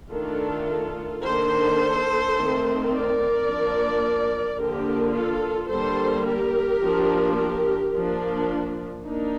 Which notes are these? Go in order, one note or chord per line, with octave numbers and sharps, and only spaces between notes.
D#3 A3 D4 F4 A4
D#3 A#3 D4 A4 C5
D#3 A3 C4
A#4 D5
F3 A#3 D4
D3 F3 A#3 D4 G4 A#4
F4 A4
D3 G3 A#3 A4 C5
G4 A#4
F3 A#3 D4
G4 A#4
F3 A#3 D4
A#3 D4 D#4